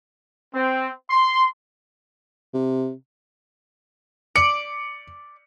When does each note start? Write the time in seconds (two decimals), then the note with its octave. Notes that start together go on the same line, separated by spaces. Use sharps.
0.54 C4
1.10 C6
2.54 C3
4.36 D5 C#7